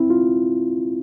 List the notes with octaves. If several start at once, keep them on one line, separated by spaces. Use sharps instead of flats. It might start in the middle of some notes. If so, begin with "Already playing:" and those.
Already playing: C4 E4
F4